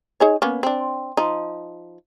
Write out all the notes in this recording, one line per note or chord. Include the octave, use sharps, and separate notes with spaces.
D#4 G#4 C#5
A#3 B3 C#4
C4 D4
F3 D#4